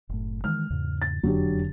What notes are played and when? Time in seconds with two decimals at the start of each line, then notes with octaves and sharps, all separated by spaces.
0.09 F#1 A2
0.44 D#3 E3 G#3 F6
0.70 E2 G#2 C#3
1.02 A6
1.23 E1 F2 D3 F#3 D4 G4